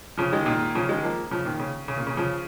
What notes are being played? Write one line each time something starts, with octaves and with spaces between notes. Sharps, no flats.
C#3 F3
D#3 G#3
A#2 D#3
C#3 F3
D#3 G#3
F3 A#3
C#3 F3
A#2 D#3
C#3
C#3
A#2
C#3
C#3 F3